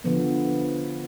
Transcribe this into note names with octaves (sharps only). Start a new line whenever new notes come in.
D3 F3 B3